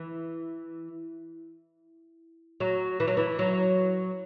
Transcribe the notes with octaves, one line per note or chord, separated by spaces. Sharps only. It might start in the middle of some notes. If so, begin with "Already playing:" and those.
Already playing: E3
F#3
E3
F#3
E3
F#3